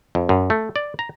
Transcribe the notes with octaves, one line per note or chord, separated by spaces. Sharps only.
F2
F#2
A3
D5
A#5